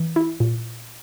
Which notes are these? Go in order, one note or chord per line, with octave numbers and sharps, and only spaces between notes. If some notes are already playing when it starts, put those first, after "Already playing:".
Already playing: E3
E4
A#2